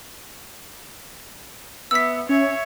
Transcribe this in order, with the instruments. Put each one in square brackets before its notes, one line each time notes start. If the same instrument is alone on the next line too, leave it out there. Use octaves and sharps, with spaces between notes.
[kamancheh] B3 E5 [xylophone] E6 B6
[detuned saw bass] C#4 [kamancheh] C#5 E5